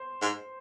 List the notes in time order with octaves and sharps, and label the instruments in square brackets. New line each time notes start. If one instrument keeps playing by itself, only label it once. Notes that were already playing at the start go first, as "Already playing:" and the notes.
Already playing: [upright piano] C5
[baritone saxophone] G#2